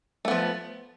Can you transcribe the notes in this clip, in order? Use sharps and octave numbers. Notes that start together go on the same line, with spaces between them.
F3 A3 B3